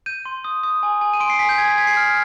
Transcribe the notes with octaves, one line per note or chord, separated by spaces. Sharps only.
G6 D#7
C6
D#6
D#6
G#5
G#5
D#7
C6 D7
C7
G#5 B6
G6
G#5 G#6
B6
G#5 G#6
C7
F6